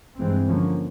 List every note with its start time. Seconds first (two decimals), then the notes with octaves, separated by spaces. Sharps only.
0.18 G2 E3 G#3 C4
0.48 D3 F3 A#3 C#4